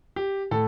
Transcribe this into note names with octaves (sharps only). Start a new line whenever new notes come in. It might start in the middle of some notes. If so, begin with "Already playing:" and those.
G4
A2 A4